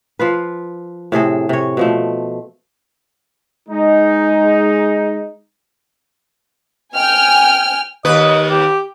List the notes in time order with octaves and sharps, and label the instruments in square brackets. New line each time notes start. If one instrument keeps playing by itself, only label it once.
[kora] F3 F4 B4
A2 C3 G#4 A4
C3 C#5
B2 F3 A3
[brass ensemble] G#3 D#4
[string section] G5 G#5 F6
[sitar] D#2 B4 [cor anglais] D#5
[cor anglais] G4